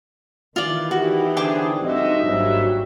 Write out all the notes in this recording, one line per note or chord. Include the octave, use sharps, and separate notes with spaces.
D#3 E3 F4 D5
B3 E4 F#4 G4
D3 D4 G#4 C5 G5 D6
G2 D3 F3 C4 D#4 F#4 D#5 E5
G#1 A#2 F#3 G3